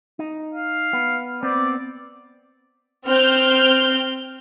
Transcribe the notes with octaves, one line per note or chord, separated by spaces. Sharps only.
D#4
F5
B3
B3 C4 D5
C4 F6 G6